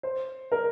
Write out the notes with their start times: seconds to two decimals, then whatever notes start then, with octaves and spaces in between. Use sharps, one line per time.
0.03 C5
0.52 A#4